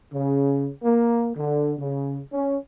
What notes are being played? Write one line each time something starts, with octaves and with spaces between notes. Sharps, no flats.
C#3
A#3
D3
C#3
C#4